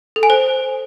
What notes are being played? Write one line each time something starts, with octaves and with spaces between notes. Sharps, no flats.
A4
G#5
C5